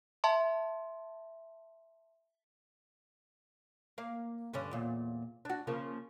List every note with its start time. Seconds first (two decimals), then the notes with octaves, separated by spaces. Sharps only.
0.24 E5 A5 C6
3.98 A#3 F5
4.53 G2 D3 C#4
4.71 E2 A#2
5.45 D4 F#4
5.67 C#3 F3 A#3